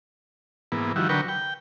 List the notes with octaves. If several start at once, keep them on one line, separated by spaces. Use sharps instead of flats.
G#2 E3 A#3 B3
D#3 F3 G3 E4 F#4
D3 F#3 A#4 B4 G5 C#6
G5